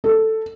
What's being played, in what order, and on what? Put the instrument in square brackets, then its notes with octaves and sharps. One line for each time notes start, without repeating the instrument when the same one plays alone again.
[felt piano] A4